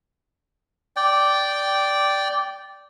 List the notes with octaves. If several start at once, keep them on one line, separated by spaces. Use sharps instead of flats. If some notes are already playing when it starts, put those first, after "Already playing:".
D5 G5